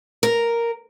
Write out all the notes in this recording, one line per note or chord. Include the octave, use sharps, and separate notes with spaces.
A#4